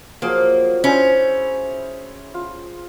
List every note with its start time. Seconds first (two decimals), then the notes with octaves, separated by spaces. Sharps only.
0.22 F3 F#3 A#3 G#4
0.84 C#4 E4 C5
2.34 F4